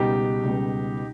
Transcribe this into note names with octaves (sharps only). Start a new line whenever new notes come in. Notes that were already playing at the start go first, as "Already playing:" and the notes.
Already playing: C#2 B2 G3 D#4 G4
C#2 B2 G3